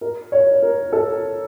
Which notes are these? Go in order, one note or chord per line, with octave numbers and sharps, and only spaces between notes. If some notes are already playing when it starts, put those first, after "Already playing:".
A#4
C#5
A#4
A4